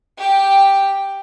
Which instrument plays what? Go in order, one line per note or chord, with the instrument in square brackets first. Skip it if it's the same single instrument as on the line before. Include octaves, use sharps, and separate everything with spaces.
[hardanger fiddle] G4 G5